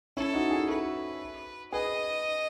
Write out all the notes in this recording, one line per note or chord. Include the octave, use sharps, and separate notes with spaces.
C#4 E4 A4
D#4 F#4
E4 G#4
F#4 A4 B4
G#4 B4 D#5